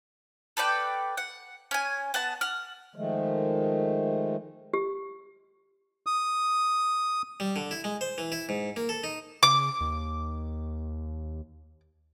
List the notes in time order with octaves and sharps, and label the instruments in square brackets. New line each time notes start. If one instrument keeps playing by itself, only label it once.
[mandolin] A4 B4 D5 G5
F#5
C#4 G#5
B3 F#5 A5
F#5 F6
[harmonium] D#3 F3 G#3 A3
[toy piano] G4
[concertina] D#6
[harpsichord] G3
D3
E4
G#3
C5
E3
E4
G#2
A#3
A4
D#4
[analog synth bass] C#3 [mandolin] D6
[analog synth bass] D#2